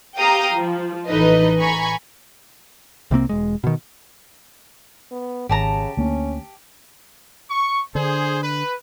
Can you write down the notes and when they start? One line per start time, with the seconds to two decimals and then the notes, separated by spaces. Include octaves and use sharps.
0.17 G4 F5 G5 A#5 D#6
0.55 F3
1.08 A1 E3 D#4 A4 B4 D#5
1.60 G#5 A#5 B5 C#6
3.11 C2 C3 A#3 C4
3.29 E1 G#3
3.64 B2 D#3
5.12 B3
5.49 G#1 C#3 G4 A5 A#5
5.97 D2 A#3 C#4
7.50 C#6
7.95 D3 D4 G#4 C5
8.43 B4